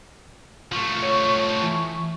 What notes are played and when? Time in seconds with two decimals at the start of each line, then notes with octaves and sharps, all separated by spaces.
0.72 F3 A3 C#6
1.03 C#5
1.63 E3